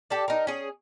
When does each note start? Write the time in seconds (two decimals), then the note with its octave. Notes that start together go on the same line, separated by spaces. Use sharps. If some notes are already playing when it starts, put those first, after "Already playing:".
0.10 G4 A4 D5
0.28 D#4 A#4
0.47 C#4 G#4